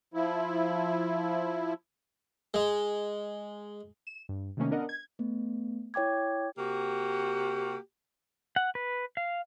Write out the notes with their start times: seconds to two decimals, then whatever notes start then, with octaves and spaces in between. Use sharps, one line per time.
0.14 F3 E4
2.54 G#3
4.07 E7
4.29 G2
4.57 C3 D#3 A3 A#3 C#4 D#4
4.71 B3 D4 A#4 D#5 F#5
4.89 G#6
5.19 A3 B3
5.94 E4 C#5 G5 D6 G#6
6.58 C3 A#3 F#4 G4
8.56 F#5
8.75 B4
9.17 F5